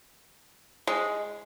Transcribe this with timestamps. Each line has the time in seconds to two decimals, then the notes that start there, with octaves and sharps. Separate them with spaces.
0.87 G#3